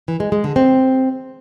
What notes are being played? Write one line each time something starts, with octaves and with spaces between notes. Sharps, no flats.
E3
G#3
G#3
D3
C4